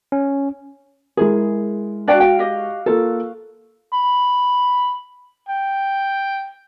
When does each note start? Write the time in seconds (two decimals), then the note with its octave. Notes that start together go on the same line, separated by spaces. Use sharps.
0.12 C#4
1.17 G#3 E4 G#4 A#4
2.08 D4 F#4 D5 F5 G5
2.20 G5
2.39 G4 D#5
2.86 A#3 F4 A4 A#4
3.94 B5
5.49 G5